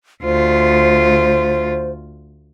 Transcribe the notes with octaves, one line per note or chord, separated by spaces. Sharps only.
D2 F4 C5